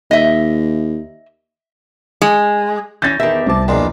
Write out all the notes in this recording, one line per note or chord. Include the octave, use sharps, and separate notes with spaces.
D#2 D#5 E5
G#3
E3 C#4 G6 A6 A#6
E2 D#3 G4 E5
C2 C3 A5 D6
A#1 E2 B2 D4 G#4 A#4 C6